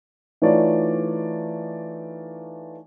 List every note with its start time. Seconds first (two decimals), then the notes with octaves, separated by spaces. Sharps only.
0.42 E3 A3 D#4 F4 C#5 D5